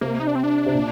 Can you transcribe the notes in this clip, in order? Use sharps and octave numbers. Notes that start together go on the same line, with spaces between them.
C3 A#3
D#4
D4
C4
D4
C3
A#2